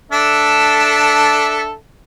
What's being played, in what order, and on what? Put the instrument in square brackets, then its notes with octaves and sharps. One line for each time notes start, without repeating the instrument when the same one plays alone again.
[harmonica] D4 A4 E5